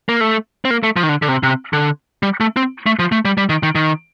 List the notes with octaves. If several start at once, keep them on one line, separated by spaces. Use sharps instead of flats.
A#3
A3
C4
A#3
A3
F3
D#3
D3
D3
C3
C3
D3
G3
A3
C4
A3
F3
A3
G3
G3
D#3
D#3
D#3